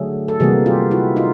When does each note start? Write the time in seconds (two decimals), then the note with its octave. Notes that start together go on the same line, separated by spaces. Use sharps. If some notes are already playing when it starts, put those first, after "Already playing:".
Already playing: D3 F#3 A3 F#4 G#4
0.28 A4
0.40 C3 E3 G3 A#3 F#4 G#4
0.66 F4 G4
0.91 E4 F#4
1.16 D#4 F4